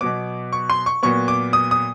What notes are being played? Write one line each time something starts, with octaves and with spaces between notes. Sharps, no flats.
B2 F#3 B3 D6
C#6
C6
C#6
A#2 F#3 B3 C#6
D6
D#6
D#6